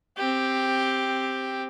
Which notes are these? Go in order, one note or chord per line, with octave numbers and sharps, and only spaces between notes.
C4 G4